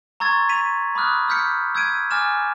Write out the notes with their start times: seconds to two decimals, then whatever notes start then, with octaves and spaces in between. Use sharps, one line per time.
0.20 A#5 C6 C#6 E6 G#6 A6
0.49 B6 D#7 F7
0.95 B5 D6 D#6 F6 F#6
1.28 E6 F6 G6 B6 C#7
1.75 E6 G6 G#6 B6 D7 D#7
2.11 G#5 D6 F6 A6 E7